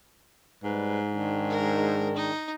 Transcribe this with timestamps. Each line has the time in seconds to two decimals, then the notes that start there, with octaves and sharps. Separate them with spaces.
0.64 G#2 G3 B4
1.12 D#3 G#3 D4
1.50 A#4
2.15 D#4